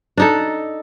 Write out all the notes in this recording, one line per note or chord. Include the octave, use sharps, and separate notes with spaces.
D4 D#4 A4